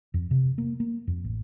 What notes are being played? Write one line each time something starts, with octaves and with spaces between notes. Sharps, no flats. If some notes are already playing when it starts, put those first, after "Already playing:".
F2
C3
A#3
A#3
F2
A1